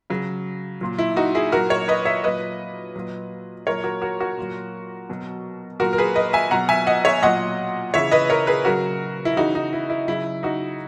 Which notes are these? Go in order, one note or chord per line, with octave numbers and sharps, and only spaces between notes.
C#3 F#3
A#2 F#3
E4
D#4 F#4
E4 G#4
A#2 F#3 F#4 A#4
A#4 C#5
B4 D#5
C#5 E5
A#2 F#3 B4 D#5
A#2 F#3
A#2 F#3 A#4 C#5
F#4 A#4
F#4 A#4
F#4 A#4
A#2 F#3
B2 F#3
A#2 F#3 F#4 A#4
A#4
G#4 B4
B4 D#5
E5 G#5
B2 F#3 F#5 A#5
E5 G#5
D#5 F#5
C#5 E5
A#2 F#3 D#5 F#5
C#3 E3 C#5 E5
B4 D#5
A#4 C#5
G#4 B4
C#3 F#3 F#4 A#4
E4
C#3 E3 D#4 F#4
D#4
E4
E4
C#3 F#3 E4
D#4 F#4